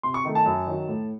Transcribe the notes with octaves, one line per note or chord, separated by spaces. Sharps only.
C3 C6
C#6
D#3 A3
A5
F#2
D#3 F#3
A2